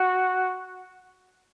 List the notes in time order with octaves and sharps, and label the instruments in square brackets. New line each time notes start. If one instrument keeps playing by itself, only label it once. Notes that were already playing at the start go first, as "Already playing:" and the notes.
Already playing: [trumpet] F#4